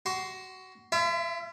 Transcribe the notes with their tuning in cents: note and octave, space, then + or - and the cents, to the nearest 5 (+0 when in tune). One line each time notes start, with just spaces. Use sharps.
F#4 +20 C6 +0
F4 -45 E5 +10